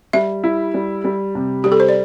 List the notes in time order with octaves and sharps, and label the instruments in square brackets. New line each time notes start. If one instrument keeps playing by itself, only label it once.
[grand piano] G3 [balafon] E5
[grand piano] E4
G3
G3
C3
[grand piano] G3 [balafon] G4
[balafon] A4
C5
D5